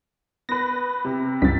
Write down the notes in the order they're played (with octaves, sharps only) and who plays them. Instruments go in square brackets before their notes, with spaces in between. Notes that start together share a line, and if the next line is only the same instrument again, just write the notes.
[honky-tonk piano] B3 B4 [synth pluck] A#6
[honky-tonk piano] C3
[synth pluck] C#2 G2 [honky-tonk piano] A6 B6